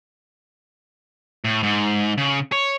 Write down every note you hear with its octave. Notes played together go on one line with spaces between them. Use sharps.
A2
G#2
C#3
C#5